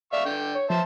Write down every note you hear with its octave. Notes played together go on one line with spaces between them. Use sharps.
D5 E5 F5 C#6
D3 G5
C#5
F3 C5 E5 A5